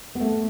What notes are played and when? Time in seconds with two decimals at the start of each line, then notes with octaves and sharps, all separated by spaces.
0.15 B3
0.20 A3